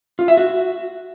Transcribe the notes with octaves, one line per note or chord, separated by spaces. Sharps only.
F4
E5
F#4